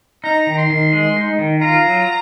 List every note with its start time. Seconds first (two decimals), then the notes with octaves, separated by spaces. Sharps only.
0.24 D#4 A#5
0.47 D#3
0.52 A#5
0.58 C6
0.70 D#3
0.93 G#3
1.16 D#4
1.39 D#3
1.61 F4 A#5
1.85 F#3